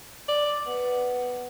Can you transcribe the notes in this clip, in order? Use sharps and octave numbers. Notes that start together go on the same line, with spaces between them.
D5
B3